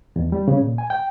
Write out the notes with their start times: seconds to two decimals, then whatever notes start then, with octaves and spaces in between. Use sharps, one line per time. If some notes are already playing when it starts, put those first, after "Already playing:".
0.16 E2
0.32 G3
0.48 C#3
0.61 A#2
0.78 G#5
0.90 G5